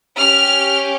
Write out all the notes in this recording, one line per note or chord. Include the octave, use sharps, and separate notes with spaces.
C#4 G4 F6